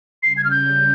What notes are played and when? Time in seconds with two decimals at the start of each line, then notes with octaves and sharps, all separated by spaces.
0.22 C#3 G3 C#4 C7
0.37 G#6
0.44 F6
0.51 G6